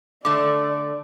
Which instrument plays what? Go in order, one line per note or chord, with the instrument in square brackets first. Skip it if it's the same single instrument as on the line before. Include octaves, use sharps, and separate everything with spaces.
[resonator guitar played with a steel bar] D3 A3 [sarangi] D5 [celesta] D6